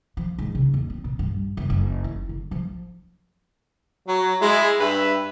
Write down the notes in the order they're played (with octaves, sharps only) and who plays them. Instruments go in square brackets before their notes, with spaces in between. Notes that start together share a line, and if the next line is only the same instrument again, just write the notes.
[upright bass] F3
G#2
C#3
D#2
C4
A#2
G2
F#1
F#1
E4
D3
F3
[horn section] F#3
G#3 E4
G2 G4 B4 E5